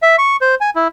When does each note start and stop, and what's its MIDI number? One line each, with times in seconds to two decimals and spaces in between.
0.02 0.16 76
0.18 0.36 85
0.41 0.55 72
0.61 0.70 80
0.76 0.88 64